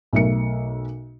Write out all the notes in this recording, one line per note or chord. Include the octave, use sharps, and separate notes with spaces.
B1 A3 A#4 E5 C#7